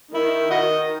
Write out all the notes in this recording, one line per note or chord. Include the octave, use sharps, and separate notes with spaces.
D#3 E4
D#3 F#4 D#5